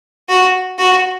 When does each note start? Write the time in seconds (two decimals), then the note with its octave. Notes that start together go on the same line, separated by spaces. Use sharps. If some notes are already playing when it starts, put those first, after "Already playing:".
0.29 F#4
0.78 F#4